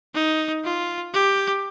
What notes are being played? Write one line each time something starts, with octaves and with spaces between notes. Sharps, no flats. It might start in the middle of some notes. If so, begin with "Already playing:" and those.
D#4
F4
G4